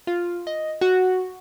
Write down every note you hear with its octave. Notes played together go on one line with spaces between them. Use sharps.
F4
D#5
F#4